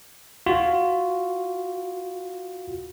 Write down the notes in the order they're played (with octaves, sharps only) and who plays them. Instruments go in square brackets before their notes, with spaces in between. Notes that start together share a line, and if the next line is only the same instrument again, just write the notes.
[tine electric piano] F4 F#4